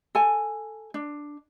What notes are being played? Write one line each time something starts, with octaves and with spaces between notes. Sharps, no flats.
A4 G#5
D4